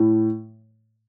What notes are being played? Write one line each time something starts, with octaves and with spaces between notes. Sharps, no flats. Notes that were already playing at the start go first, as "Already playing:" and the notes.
Already playing: A2